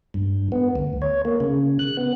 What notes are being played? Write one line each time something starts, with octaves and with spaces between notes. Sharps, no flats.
G2
B3
D2
C#5
A#3
C#3
F#6
B3